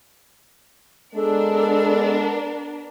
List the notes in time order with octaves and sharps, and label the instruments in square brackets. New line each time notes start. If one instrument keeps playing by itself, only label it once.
[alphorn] G#3 [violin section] B3 D4 A#4 [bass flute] A4